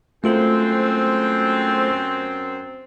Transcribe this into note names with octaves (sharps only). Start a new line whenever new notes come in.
F#2 A3 C4 F4 A4